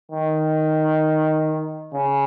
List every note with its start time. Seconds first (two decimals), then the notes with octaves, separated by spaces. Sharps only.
0.12 D#3
1.94 C#3